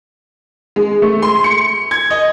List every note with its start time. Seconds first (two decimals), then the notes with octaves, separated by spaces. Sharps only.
0.76 G#3
1.02 A3
1.22 C6
1.44 C#7
1.91 G#6
2.10 D#5